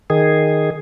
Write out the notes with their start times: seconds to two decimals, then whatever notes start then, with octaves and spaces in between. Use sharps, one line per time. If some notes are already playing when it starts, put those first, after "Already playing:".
0.10 D#3 G#4